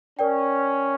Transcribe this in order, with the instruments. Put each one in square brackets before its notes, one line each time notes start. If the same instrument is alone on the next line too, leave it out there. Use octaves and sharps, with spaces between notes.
[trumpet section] C#4 [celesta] A#4 D5 G5